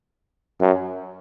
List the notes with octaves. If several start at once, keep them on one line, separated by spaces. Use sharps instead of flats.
F#2